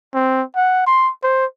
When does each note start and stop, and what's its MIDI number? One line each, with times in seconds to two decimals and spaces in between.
0.15 0.43 60
0.56 0.84 78
0.87 1.10 84
1.23 1.45 72